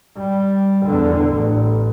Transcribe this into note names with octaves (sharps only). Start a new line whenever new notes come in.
G3
E2 D3
A1